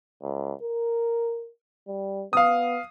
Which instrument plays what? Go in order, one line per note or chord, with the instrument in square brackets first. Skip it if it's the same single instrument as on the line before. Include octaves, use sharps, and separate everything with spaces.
[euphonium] C#2
A#4
G3
[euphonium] B3 [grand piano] F5 D#6